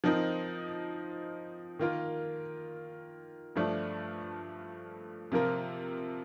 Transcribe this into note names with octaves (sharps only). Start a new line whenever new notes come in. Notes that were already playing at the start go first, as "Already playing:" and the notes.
F3 C4 D#4 A#4
D#3 A#3 F4 A#4
G2 F3 A3 D4
C3 F3 A#3 F4 A#4